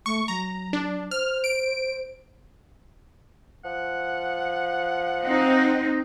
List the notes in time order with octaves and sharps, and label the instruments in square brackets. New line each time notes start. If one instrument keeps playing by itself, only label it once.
[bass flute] A3 [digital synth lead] C#6
[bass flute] F#3 [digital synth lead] A#5
[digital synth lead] D4
[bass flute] C5 [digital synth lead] F6
[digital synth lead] D7
[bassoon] F3 [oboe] F#5
[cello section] C4 D#4